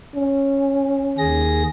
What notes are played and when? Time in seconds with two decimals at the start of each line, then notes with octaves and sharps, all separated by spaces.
0.16 C#4
1.18 D#2 G#4 A#6